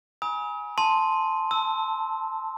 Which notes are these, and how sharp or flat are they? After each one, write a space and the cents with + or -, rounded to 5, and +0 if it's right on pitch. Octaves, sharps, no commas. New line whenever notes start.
G#5 +0 B5 -40 D#6 +40
A5 +0 C6 +0
A5 +15 E6 -15